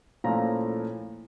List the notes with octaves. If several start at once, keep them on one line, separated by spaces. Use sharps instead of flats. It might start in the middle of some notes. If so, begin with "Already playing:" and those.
A#2 F3 A3 C#4 E4 A#5